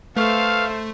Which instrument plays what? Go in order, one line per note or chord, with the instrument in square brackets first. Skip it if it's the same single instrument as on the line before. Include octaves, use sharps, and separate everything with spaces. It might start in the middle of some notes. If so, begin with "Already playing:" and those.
[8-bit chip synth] A3 [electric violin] A4 C5 [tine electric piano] B4 C#6 F6 [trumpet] F5